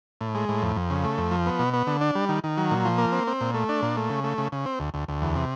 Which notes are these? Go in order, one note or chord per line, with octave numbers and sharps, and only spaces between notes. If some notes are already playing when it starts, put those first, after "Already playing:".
A2
G#3
A2
F2
F2
C#3
A3
F2
F3
B3
B2
B3
D3
D4
G3
D#3
D#3
F#3
A#2
F3
A#3
C4
C4
A#2
A3
D4
A#2
A3
C#3
A3
C#3
C#3
C4
D2
D2
D2
E2
C3